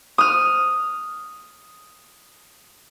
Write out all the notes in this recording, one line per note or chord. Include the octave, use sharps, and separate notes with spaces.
D#6 F6